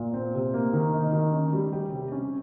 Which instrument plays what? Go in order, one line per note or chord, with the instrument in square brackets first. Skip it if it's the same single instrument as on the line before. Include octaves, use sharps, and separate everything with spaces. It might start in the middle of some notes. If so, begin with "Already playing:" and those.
Already playing: [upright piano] A#2
C4
C3
A#3
D#3
D#4
D#3
C#4
G3
G4
C3
C#4